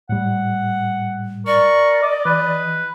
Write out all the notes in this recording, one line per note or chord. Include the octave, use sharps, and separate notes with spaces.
A2 G3 F#5
A#4 D5 C#6
D#5 D6
E3 B4